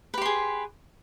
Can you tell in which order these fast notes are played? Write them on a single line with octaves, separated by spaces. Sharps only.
B4 G4 C6 G#4